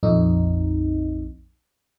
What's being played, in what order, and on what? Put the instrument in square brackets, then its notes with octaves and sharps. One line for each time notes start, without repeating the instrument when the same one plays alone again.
[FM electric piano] A#1 F2 D#4